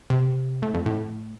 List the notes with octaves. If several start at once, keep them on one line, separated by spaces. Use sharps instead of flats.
C3
A2
F2
A2